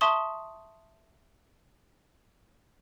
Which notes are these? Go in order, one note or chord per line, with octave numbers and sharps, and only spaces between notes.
E5 A5 C6 C#6 D#6 G7